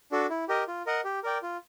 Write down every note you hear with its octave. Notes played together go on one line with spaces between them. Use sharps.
D4 F#4 A4
E4
G4 A#4 D#5
F4
A#4 D#5 F#5
G4
A#4 D5 G5
F4